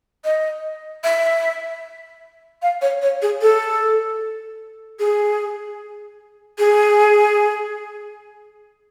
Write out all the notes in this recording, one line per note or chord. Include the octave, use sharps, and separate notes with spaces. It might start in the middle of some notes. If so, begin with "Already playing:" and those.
D#5
E5
F5
C#5
C#5
G#4
A4
G#4
G#4